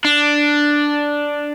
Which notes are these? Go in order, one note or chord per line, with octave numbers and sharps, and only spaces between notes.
D4